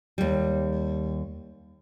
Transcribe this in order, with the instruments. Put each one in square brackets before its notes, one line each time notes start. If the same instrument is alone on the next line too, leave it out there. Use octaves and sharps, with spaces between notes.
[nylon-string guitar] D#2 G3